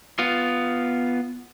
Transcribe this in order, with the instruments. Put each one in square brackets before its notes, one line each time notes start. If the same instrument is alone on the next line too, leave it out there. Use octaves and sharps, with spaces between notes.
[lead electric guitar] B3 F4